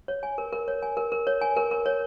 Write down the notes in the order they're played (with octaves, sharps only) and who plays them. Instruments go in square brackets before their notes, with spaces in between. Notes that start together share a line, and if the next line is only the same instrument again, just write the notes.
[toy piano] C#5
G#5
A#4
A#4
C#5
G#5
A#4
A#4
C#5
G#5
A#4
A#4
C#5